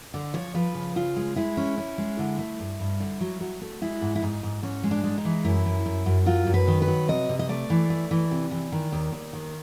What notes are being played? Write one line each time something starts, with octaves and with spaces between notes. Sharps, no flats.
D3
F3 C#5
F3 B4
C#3
C#3 F4
G#3
G#3 E4
C#4
C#4
G#3
D3
A3
G2
G2
D3
F#3
F#3
A3
G#3 E4
G#2
E4
G#2 D#4
G#2
G#2 C#4
G#3
D4
G#3
D#4
E3
F#2 E4
F#2
F#2
F#2
F#3 F4
F#2
B4
D#3
B4
F#3
C3 D#5
C3
D#5
A3 D5
E3
A3
E3
C3
E3
D#3
D#2
D#2
D#3